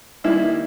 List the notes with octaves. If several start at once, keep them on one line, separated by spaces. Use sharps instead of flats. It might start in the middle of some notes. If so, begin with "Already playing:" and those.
D#3 G3 A#3 D#4 E4